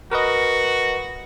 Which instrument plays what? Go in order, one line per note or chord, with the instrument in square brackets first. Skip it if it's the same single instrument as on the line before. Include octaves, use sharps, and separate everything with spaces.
[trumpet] F#4 [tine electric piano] A#4 B4 D#5